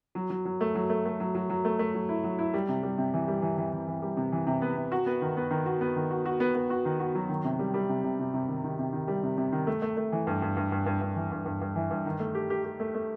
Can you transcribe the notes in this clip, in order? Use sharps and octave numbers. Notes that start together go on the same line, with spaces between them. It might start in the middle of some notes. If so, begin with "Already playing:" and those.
F#3
F#3
F#3
A3
F#3
A3
A3
F#3
F#3
F#3
A3
A3
F#3
E4
F#3
E4
G3
C3
G3
C3
E3
G3
E3
E3
E3
E3
G3
C3
E3
C3
B3
C3
F#4
B3
D#3
B3
D#3
F#4
B3
D#3
F#4
F#4
B3
B3
F#4
D#3
F#4
F#3
D#3
C3
G3
G3
C3
C3
C3
C3
D#3
D#3
C3
D#3
G3
C3
C3
D#3
A3
A3
A3
E3
G2
G2
G2
G2
G2
G2
E3
G2
G2
G2
E3
G2
D#3
A3
G4
G4
G4
A3
A3